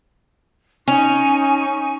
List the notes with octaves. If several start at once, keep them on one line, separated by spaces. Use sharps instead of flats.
C#4 D#4 G#5 C#6